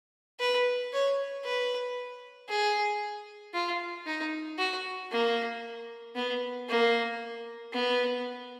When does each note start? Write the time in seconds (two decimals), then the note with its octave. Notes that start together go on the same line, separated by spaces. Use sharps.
0.40 B4
0.93 C#5
1.44 B4
2.49 G#4
3.54 F4
4.07 D#4
4.59 F#4
5.12 A#3
6.16 B3
6.69 A#3
7.73 B3